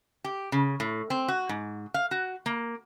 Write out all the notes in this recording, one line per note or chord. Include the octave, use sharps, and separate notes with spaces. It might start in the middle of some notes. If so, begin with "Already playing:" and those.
G4
C#3
A2
C4
F#4
G#2
F5
F#4
A#3